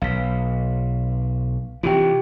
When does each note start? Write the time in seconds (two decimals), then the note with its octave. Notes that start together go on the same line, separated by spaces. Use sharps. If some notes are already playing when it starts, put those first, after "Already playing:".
0.02 B1 F5 B6
1.83 C3 E3 F4 G4 G5